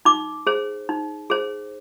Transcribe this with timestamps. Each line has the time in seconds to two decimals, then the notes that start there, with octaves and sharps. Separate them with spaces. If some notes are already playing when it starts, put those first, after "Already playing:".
0.05 D#4 D6
0.47 G#4 C5
0.89 D#4
1.30 G#4 C5